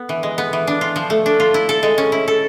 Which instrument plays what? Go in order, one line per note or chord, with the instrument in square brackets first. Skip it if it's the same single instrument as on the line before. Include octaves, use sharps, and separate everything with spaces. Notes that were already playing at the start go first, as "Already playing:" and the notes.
Already playing: [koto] B3
E3
G#3
B3
E3
D4
F4
F3
A3
D4
F4
E4
A4
G#3
C#4
E4
A4